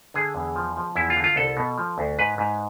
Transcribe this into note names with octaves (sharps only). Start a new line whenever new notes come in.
D3 G#4
E2
F3
F3
E2 E4
F4
D3
F4
C2 A4
B2
F3
D2
G#2 B4
G#2